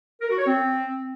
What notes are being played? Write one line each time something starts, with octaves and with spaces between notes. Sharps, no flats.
A#4
F#4
C#5
C4